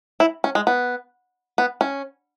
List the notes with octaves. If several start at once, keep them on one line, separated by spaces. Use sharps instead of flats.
E4
C#4
G#3
B3
B3
C#4